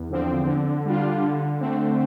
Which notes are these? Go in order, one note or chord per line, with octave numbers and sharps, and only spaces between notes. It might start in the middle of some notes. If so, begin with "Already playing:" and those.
Already playing: E2
D3 F3 C4
D3
G3 D4 F4
D3
A3 C4